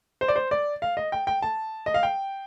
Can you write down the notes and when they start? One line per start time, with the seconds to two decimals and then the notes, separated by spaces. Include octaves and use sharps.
0.21 C5
0.28 D5
0.36 C5
0.51 D5
0.82 F5
0.97 D#5
1.12 G5
1.27 G5
1.42 A5
1.86 D#5
1.94 F5
2.03 G5